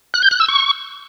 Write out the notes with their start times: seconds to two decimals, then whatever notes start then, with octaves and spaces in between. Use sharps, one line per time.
0.14 F#6
0.23 G6
0.31 F#6
0.40 E6
0.49 C#6